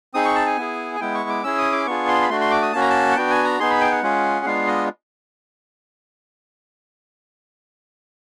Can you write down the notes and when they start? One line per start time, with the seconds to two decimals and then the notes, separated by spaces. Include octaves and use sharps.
0.14 C4 D#4 G#4 D#6
0.25 C#6
0.35 A5
0.46 G#5
0.57 B3 E4 G#4
0.96 G#5
1.00 G#3 B3 E4 G5
1.15 C#6
1.29 D6
1.44 C#4 E4 G#4 E6
1.58 D#6
1.72 D6
1.86 B3 D4 F4 G#4 C#6
2.08 C6
2.22 B5
2.29 A3 D4 F#4 C6
2.41 C6
2.51 D6
2.62 D#6
2.73 A#3 C#4 F#4 A5
2.81 A#5
2.90 A5
3.12 F#5
3.16 B3 D4 F#4 G5
3.30 G#5
3.45 A#5
3.60 B3 D#4 G#4 C6
3.70 B5
3.81 G5
3.92 F#5
4.03 G#3 C#4 F4 G#4
4.46 G#3 B3 D4 F4 F5
4.67 D#5